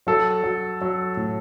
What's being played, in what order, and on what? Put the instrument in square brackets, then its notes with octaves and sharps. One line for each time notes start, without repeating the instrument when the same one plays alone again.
[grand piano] F#3 A4
F#3
F#3
A2